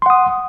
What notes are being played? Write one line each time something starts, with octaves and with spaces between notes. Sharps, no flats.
F#5 C6 D#6